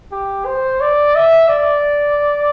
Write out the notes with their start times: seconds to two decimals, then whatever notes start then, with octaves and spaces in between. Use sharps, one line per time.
0.12 G4
0.45 C5
0.81 D5
1.15 E5
1.49 D5